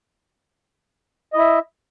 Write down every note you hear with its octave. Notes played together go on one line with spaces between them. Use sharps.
E4 D#5 E5